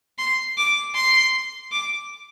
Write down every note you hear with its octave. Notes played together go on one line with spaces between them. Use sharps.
C6
D6
C6
D6